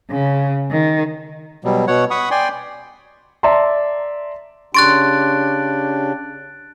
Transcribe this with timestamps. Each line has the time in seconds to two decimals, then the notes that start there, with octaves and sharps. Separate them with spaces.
0.10 C#3
0.70 D#3
1.65 B2 F#3 G3
1.87 B2 C#5 F#5
2.11 F#5 B5 C#6 D#6
2.31 D5 G5 G#5 C6
3.43 D5 E5 A5 A#5 C6
4.74 C#3 D4 G4 C6 C#6 F#6 A6 D7